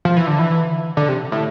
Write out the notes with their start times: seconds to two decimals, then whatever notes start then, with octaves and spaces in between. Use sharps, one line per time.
0.05 F3
0.17 E3
0.27 D3
0.39 E3
0.97 D3
1.09 C3
1.32 A2